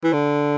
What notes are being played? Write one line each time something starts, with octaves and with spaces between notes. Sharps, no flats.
E3
D3